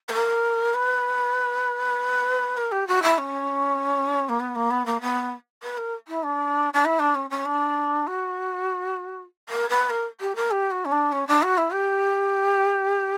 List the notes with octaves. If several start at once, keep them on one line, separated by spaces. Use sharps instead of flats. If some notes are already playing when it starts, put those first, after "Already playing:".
B4
A#4
B4
A#4
G4
F#4
E4
C#4
A#3
B3
A#3
B3
A#3
B3
B4
A#4
E4
D4
D4
E4
D4
C#4
C#4
D4
F#4
A#4
B4
A#4
G4
A#4
G4
F#4
C#4
D4
C#4
D4
F#4
E4
G4